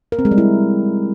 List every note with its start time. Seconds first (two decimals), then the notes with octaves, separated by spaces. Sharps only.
0.12 A#4
0.19 C4
0.25 G#3
0.31 G3
0.38 E4